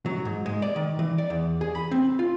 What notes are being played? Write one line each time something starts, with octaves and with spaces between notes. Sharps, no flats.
F#3
G#2
G#3
D5
D#3
E3
D5
E2
G#4
B5
C4
F4